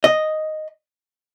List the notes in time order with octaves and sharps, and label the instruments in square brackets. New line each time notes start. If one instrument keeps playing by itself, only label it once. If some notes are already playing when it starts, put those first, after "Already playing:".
[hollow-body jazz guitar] D#5